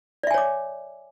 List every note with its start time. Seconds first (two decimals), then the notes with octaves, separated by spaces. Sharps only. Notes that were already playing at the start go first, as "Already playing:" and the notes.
0.23 D5
0.27 E5
0.31 G#5
0.34 C#5
0.38 D6